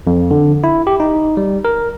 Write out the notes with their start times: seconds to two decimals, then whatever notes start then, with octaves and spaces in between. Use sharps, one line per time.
0.07 F2
0.31 D3
0.64 E4
0.87 G4
1.00 D#4
1.37 G3
1.65 A#4